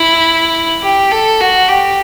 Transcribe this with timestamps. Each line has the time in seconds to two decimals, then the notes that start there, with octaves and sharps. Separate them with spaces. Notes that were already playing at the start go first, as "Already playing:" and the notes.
Already playing: E4
0.83 G4
1.11 A4
1.40 F#4
1.68 G4